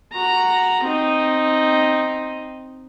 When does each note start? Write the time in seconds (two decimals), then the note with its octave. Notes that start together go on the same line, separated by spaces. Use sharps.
0.13 F#4 A#5
0.84 C4 D#4